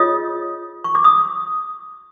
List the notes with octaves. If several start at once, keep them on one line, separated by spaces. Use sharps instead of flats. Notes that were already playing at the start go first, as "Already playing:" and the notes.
Already playing: F4 G#4 C#5 D#5 D#6
C#6
D6
D#6